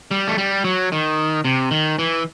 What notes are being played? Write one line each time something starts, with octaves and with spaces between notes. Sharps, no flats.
G3
A3
G3
F#3
D#3
C3
D#3
E3